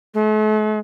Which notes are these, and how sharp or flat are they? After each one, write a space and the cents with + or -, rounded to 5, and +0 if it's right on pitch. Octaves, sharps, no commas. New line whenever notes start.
A3 -45